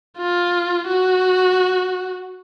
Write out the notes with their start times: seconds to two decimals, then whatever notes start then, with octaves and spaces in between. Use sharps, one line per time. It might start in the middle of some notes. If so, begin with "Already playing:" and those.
0.17 F4
0.88 F#4